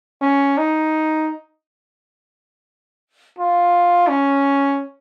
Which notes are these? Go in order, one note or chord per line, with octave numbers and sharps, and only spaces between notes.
C#4
D#4
F4
C#4